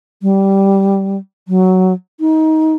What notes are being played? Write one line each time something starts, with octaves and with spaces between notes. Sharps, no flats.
G3
F#3
D#4